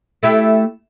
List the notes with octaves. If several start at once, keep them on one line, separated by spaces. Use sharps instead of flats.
A3 E4 G4